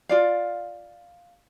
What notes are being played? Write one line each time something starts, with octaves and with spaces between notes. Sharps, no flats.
F4 D5 F5